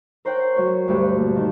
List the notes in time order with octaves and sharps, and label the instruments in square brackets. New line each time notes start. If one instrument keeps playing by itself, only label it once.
[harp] A#4 C5 C#5 F#5 G5
F#3 C#5
D2 G2 G3 G4
A#2
D#3